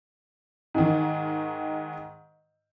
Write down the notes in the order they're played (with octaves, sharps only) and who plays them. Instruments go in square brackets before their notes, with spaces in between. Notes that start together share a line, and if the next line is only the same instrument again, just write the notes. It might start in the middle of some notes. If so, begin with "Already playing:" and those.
[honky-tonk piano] G#2 D#3